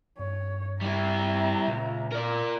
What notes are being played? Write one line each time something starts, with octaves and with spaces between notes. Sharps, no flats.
G2 C#5
G3 E4 E5 A#5
C#2 A#2
A#4 D5